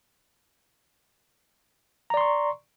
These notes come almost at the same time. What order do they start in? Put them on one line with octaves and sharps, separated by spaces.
A#5 D5 C6 C#6